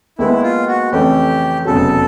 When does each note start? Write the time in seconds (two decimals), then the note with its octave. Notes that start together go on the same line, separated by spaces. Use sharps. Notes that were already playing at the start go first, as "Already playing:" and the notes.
0.19 D#2 D#3 G#3 B3 E4
0.43 F4
0.67 F#4
0.91 F2 C#3 E3 A3 C#4 G4
1.65 F1 E2 C#3 F#3 A4